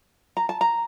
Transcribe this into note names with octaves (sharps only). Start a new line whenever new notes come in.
A#5
A5
A#5